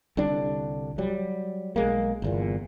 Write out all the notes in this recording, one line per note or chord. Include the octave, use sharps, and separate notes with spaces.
C2 D3 G3 D4
F#3 G3
B1 G#3 A#3
G1 E2 A#2